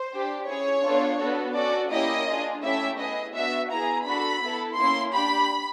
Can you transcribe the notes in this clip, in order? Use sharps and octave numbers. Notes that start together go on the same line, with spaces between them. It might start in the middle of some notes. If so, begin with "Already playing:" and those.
Already playing: C5
D4 G4
C#4 E4 G#4 C#5
B3 D4 F4 A4
B3 D4 F#4 A4
C#4 F#4 A4 D5
A#3 C#4 E4 G4 D#5
D4 F4 G#4
A3 C#4 E4 G4 E5
B3 E4 G#4 D#5
B3 D4 F#4 E5
B3 E4 G#4 A#5
D4 F#4 A4 B5
B3 E4 A4
A#3 C#4 E4 C6
D4 G4 B5